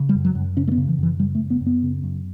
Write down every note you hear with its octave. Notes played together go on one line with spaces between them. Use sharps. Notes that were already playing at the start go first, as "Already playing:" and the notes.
Already playing: C#3
G3
F#2
F#3
F#2
C#3 C#4
A3
B3
C#3
E3
F#2 E3
C#3 G3
A3
F#2
B3
F#2
B3
C#3
F#2